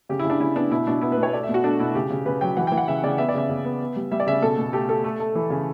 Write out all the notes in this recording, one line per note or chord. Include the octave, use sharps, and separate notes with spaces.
C#3 G4
E4
C#3
D4
C#3 E4
B3 D4
B2 E4
B2 D4
B3 E4
B4
B2
C#5
A3 D5
E5
B2
F#4
A3 D4
B2 E4
C#3 G4
C#3
C#3 B4
F#3 G5
E3 F#5
G5
E3
F#5
C#3 E5
C#3 D5
B3 E5
D5
C#3 E5
C#3
B3
B3
G3
G3 E5
D5
C#3 E5
B2 A4
B2
A3 G4
A3 A4
A3
A3
E3
C#3